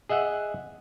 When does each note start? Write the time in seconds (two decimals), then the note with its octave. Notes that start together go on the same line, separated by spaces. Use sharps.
0.09 G#4 D#5 E5 F#5